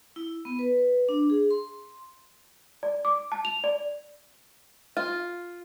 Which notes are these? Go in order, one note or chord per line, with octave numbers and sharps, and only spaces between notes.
E4
B3
B4
D4
G#4
C6
D5
D6
A5
F7
D5
F4